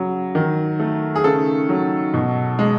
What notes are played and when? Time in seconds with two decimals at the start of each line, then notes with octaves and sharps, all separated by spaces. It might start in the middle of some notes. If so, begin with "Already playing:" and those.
Already playing: C#3 F#3
0.35 D#3
0.80 A3
1.16 G#4
1.24 C#3 A4
1.69 F#3
2.14 B2
2.59 G#3